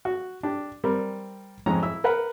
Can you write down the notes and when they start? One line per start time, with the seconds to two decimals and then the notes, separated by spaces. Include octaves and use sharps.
0.05 F#4
0.43 D4 G4
0.84 G3 C4 A#4
1.66 F2 G#2 C#4 A#5
1.83 E4 E5 E6
2.04 A#4 B4 F#5